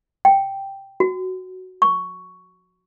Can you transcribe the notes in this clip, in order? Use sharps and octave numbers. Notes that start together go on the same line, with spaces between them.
G5
F#4
C#6